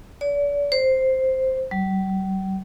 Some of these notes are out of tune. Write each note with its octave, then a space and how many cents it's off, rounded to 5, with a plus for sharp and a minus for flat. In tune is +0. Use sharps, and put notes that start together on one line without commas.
D5 -40
C5 +0
G3 -45